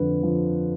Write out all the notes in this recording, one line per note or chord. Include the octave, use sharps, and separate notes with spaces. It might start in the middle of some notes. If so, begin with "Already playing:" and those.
Already playing: F2 D3 B4
F3